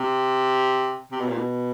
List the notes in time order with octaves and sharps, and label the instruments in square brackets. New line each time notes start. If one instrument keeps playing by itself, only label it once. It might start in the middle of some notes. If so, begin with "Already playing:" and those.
Already playing: [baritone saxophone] C3
C3
B2
A#2
B2